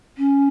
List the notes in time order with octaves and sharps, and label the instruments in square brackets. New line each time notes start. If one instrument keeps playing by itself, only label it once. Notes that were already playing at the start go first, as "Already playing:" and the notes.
[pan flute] C#4